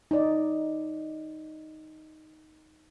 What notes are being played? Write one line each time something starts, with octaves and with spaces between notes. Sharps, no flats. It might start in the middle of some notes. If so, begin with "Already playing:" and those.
D#4 D5